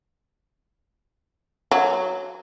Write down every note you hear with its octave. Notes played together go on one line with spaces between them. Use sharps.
F#3